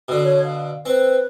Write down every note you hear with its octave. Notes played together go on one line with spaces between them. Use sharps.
B2 D3
C#5
F5
C4 B4